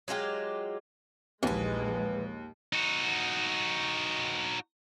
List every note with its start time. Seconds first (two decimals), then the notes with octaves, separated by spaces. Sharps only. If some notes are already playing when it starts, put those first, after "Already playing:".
0.08 F#3 G#3 F4 G4
1.43 A#1 D#2 E3 G#3 B4
2.73 D#4 F#4